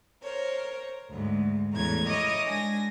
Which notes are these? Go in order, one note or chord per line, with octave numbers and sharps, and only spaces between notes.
A#4 C5 C#5
D2 G#2
E2 A2 G3 C#4 A#5 G#6
E4 A#4 C#5 D#5 D6 D#6
G#3 D4 G#5 A#6